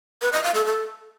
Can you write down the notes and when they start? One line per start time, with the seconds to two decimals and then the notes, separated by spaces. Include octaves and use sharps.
0.22 B4
0.33 D#5
0.44 F5
0.55 A4
0.66 A4